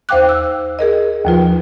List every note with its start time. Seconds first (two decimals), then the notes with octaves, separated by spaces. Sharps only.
0.09 D#2 C5 F5 G5 D6 F#6
0.29 E6
0.79 G#4 A#4 D#5
1.25 D#2 F3 F4 B4